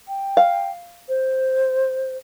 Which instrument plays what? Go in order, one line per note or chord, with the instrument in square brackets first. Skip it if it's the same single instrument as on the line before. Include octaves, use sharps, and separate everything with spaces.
[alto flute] G5
[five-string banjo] F5
[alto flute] C5